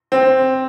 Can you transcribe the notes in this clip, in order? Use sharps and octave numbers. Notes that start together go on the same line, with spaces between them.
C4